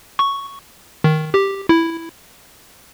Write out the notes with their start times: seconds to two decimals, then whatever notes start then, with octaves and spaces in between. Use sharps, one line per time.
0.19 C#6
1.04 D#3
1.34 G4
1.69 E4